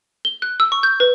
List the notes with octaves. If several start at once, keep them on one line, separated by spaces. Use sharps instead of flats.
G7
F#6
E6
C#6
G6
B4